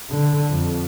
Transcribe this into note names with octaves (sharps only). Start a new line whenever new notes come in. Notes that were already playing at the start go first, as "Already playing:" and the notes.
D3
F2